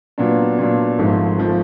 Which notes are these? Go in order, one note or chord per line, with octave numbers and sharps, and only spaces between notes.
A#2 F#3 B3 D4
A#2 F#3 B3 D4
G#1 G#2 F3 A3
F3 A3